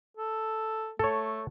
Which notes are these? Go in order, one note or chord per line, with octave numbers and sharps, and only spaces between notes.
A4
A3 A4 C#5